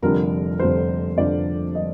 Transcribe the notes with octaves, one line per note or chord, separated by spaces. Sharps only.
F1 F2 D3 G3 D4 A#4
F1 F2 D3 G3 D4 C5
F1 F2 D3 G3 D4 D5
D3 G3 D#5